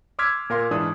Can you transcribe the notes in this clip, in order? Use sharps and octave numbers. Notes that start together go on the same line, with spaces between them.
C6 D6 E6 F6 G#6 B6
A#2 A#4 F5 C6
G#2 E3 D4 D#6